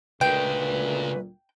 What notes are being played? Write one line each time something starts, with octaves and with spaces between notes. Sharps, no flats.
D2 A#2 C#3 G#3 B4 G5